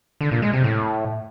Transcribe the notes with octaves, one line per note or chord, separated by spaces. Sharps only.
D3
A#2
G#3
C3
A2